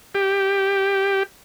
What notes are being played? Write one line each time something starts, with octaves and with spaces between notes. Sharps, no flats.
G4